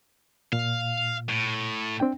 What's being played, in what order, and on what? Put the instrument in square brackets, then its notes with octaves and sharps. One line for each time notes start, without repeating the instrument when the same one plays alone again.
[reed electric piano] A#2 [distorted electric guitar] F5
[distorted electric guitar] A2
[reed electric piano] C4 D4 G5